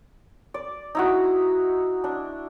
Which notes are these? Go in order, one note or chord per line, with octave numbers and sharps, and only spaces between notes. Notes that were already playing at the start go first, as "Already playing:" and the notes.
D5
D#4 E4 F#4
D4